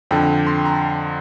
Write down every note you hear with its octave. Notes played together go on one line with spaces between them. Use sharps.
F2 D3 G5
C6
A#5